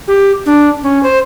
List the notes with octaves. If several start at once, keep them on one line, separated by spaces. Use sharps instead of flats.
G4
D4
C#4
C5